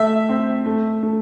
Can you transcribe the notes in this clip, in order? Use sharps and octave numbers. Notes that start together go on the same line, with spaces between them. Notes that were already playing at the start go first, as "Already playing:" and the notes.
Already playing: A3 E5
C4
A3
A3